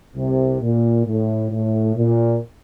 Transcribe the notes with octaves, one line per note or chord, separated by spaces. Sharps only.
C2 C3
A#2
A2
A2
A#2